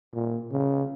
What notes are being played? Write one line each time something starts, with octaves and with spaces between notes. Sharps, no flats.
A#2
C#3